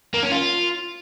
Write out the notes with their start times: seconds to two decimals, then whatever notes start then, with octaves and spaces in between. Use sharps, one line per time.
0.14 A#3
0.23 C#4
0.32 F4